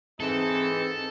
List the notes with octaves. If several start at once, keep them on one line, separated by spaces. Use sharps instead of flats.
G#2 E3 C4 D#4 A4